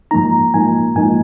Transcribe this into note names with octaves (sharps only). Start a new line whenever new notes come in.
G#2 F3 A#3 D#4 A#5
G#2 F3 A#3 D#4 G#5
G#2 F3 A#3 D#4 G#5